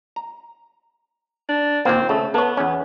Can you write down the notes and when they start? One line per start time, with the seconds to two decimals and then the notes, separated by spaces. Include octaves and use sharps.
0.16 A#5
1.49 D4
1.85 D#2 A#2 A#3 C4
2.09 C#3 A3
2.34 B3 A4 C#5
2.57 E2 C#4